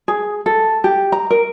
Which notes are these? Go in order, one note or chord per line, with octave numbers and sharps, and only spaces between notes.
G#4
A4
G4
A#5
A#4